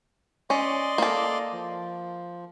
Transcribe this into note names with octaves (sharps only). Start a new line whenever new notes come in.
C#4 D5 D#5 C6
A#3 A4
F3